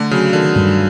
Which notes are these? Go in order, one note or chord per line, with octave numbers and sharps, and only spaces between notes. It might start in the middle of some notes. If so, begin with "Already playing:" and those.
Already playing: D3 A3
C#3 F#3
D3 D#3
G2